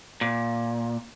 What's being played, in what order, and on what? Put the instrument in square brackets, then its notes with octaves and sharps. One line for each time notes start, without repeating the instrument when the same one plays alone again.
[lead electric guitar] A#2